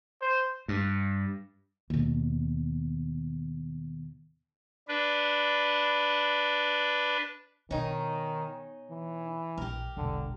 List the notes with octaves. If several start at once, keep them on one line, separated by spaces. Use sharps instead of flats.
C5
G2
D#2 B2
D4 B4
B2 D#3 C#4 D#4
E3
A#1 G4 A#4
E1 A#1 D3